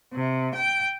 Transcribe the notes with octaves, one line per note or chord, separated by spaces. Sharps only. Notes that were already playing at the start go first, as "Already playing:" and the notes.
C3
G5